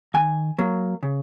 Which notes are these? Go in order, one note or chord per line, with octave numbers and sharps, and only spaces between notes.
D#3 G#5
F#3 A#3
C#3